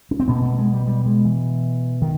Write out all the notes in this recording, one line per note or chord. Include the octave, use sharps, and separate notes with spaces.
C#4
C4
B2 B3
A#3
A3
G#3
G3
G3
G#3
E3
D#3